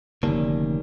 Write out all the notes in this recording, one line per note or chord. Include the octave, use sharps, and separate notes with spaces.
F1 D3 D#3 G3 A#3 C#4